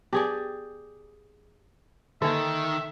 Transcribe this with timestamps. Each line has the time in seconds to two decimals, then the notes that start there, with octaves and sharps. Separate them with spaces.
0.13 B3 G4 G#4 B4 D5 D6
2.22 D3 D#3 A#3 A4 E5